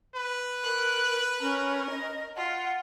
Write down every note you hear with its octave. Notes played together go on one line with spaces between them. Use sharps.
B4
A#4 F#6
C#4 A#4
D#5
F4 F#5